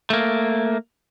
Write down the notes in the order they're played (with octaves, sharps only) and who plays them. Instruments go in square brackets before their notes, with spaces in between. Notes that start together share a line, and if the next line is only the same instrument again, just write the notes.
[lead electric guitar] A3 A#3